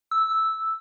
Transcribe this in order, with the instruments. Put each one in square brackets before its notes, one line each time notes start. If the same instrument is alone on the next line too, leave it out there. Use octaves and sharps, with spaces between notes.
[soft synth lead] E6